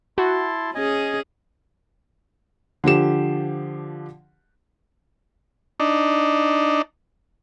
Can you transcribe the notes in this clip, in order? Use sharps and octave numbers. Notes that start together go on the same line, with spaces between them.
E4 F#4 A5 C6
C#4 G#4 D#5 G#5
D3 F3 G4 E7
D4 D#4